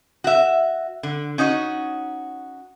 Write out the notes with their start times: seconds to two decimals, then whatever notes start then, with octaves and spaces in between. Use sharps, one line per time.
0.24 F#4 E5
1.03 D3
1.38 C#4 D#4 F#4 D#5